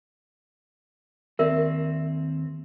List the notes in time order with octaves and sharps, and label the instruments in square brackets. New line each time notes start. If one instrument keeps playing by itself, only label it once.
[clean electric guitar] D#2 C4 [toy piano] A#4 D5 E5